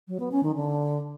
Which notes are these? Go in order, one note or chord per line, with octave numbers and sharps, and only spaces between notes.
F#3
B3
C#4
D#3
D3